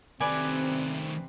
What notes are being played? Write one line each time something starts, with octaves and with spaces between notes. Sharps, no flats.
C3 D#3 A3 C4 B4 D5 G#5